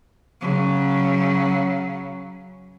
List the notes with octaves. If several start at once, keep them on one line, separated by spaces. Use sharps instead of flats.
C#3 F#3